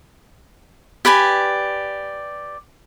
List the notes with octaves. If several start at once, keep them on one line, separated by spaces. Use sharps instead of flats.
G4 B4 D5 G#5